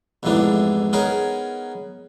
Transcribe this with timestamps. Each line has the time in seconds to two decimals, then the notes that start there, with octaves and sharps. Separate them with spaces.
0.23 A1 F2 G#2 E3 B3 D4
0.93 B3 C#4 D#4 G#4 A#4